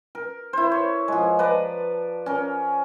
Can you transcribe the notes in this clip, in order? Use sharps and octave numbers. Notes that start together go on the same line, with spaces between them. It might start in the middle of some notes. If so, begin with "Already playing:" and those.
A#4
E4 C5
C#5
F3 G#3
B4 D5 A5 A#5
C#4 A#4